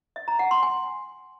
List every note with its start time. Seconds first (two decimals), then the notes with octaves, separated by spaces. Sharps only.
0.16 E5
0.28 A#5
0.39 F#5
0.51 C6
0.63 G#5